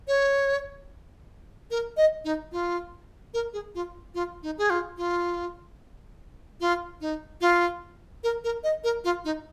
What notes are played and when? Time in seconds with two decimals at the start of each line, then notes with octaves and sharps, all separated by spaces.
0.08 C#5
1.71 A#4
1.97 D#5
2.25 D#4
2.52 F4
3.34 A#4
3.53 G#4
3.75 F4
4.14 F4
4.43 D#4
4.58 G#4
4.70 F4
4.97 F4
6.60 F4
7.01 D#4
7.41 F4
8.24 A#4
8.44 A#4
8.64 D#5
8.84 A#4
9.04 F4
9.25 D#4